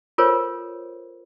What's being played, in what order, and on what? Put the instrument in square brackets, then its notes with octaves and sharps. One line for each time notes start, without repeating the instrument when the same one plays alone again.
[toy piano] F4 A4 A#4 C5 C#5